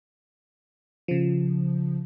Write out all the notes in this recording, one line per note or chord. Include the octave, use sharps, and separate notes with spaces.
C#3 F3